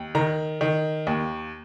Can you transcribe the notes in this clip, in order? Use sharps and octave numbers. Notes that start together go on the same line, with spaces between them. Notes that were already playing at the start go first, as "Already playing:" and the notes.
Already playing: D#2
D#3 A#5
D#3
D#2